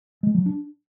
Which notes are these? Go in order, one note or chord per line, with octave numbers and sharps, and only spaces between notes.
G#3
F#3
D4